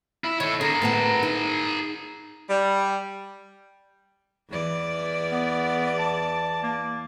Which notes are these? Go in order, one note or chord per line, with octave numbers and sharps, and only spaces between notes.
E4
D#3 A4 C#5
D3 G#4 A#4
A2 B3 A5
D#4
G3
E2 E3 D5
B3
A5
A#3